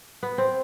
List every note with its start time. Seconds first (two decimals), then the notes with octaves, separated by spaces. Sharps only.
0.23 B3
0.38 C4